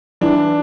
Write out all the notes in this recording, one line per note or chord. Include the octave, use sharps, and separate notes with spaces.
E3 D4